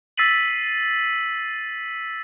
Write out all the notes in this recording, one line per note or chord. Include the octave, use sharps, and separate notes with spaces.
E6 A6 B6 C7 D#7 F#7